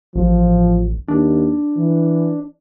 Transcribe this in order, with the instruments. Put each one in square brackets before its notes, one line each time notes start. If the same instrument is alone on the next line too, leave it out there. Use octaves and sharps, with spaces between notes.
[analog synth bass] A1 [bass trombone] F3
[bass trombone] D#2 [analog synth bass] D4
[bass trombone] E3